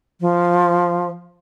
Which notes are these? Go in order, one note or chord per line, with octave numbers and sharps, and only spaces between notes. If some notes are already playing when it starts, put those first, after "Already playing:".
F3